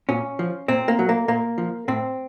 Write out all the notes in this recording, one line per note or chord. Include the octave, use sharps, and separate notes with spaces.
A#2 C#4
F3
A#2 C4
A#3
F#3
A#3
A#2 A#3
F3
A2 C4